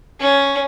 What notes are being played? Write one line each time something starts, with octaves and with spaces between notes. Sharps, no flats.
C#4